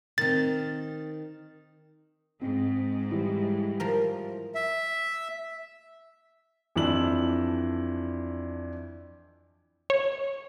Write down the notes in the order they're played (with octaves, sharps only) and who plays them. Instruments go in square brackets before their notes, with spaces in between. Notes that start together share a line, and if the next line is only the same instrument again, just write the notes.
[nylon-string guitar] D#3 C4 [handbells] A6
[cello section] G#2 [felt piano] C4
[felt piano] E3 G3 E4
[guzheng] F3 A#4
[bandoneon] E5
[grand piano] F2 E3 D4 E4 E6 F#7
[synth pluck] C#5